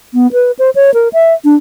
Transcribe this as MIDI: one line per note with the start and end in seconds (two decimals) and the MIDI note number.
0.14 0.31 59
0.32 0.51 71
0.59 0.70 72
0.75 0.94 73
0.94 1.08 70
1.13 1.33 76
1.44 1.55 62